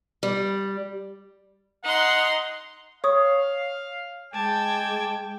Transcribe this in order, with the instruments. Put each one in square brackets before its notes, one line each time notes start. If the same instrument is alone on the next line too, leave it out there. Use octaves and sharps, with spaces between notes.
[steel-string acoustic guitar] G3
[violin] D#4 C6 [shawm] F#5
[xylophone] C#5 C#6 D#6 [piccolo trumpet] F5
[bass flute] G#3 [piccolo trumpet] G5 [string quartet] A5 D6 G#6